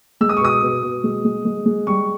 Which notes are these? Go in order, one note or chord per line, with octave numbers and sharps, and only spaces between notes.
G#3 E6
D#6
C#6
B2 D#6
B2
B2
G#3
G#3
G#3
G#3
G3 C#6